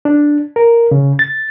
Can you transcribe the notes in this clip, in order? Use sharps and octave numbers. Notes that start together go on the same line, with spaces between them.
D4
A#4
C#3
A6